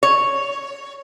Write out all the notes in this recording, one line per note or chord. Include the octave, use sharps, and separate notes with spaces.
C#5